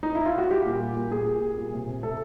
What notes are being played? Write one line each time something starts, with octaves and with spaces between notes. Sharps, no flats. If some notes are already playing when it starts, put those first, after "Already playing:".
D#4
E4
F4
F#4
G3 G4
A#2
G3
A#2
A#2 G#4
A#2
G3
A#2
C3
C3
A3 A4